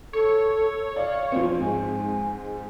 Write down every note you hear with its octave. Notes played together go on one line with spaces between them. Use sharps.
A4 C#5
D5 F5
F3 C4
G#2 G#5